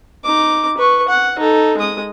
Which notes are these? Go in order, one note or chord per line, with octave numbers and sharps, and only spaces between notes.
D#4 D6
B4 C#6
F#5
D#4 A4
G#3 D#6